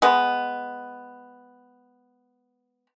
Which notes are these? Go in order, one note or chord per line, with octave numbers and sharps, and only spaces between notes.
G#3 B3